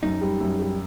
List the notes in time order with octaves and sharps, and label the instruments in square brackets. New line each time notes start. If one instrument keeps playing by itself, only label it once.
[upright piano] F#2 [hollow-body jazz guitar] D#4
[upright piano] G3
F#2
G3